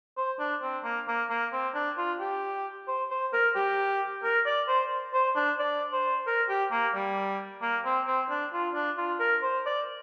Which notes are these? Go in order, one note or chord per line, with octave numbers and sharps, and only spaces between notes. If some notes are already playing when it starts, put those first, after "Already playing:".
C5
D4
C4
A#3
A#3
A#3
C4
D4
F4
G4
C5
C5
A#4
G4
A#4
D5
C5
C5
D4
D5
C5
A#4
G4
A#3
G3
A#3
C4
C4
D4
F4
D4
F4
A#4
C5
D5